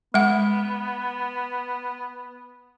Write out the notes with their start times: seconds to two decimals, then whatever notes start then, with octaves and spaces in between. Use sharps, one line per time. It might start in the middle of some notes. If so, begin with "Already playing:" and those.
0.14 G#3 B3 F#5